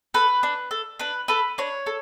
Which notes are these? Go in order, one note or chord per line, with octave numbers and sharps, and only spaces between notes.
A4 B4
D4
A4
D4 B4
A4 B4
D4 C#5
A4